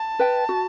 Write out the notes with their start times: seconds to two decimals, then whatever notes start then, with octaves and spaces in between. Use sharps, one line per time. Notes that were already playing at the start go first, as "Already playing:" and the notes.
Already playing: A5
0.19 B4 E5 G5
0.49 F#4